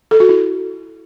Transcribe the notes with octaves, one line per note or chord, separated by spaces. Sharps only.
A4
F#4
E4